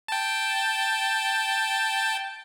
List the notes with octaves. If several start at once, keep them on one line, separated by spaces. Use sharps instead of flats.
G5 A5